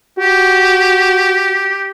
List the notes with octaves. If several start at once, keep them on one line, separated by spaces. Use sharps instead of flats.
F#4 G4